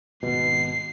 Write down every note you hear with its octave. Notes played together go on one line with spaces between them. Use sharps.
G#1 B2 C7